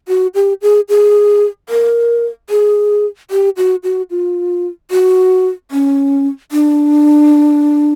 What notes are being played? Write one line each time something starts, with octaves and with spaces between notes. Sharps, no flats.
F#4
G4
G#4
G#4
A#4
G#4
G4
F#4
F#4
F4
F#4
C#4
D4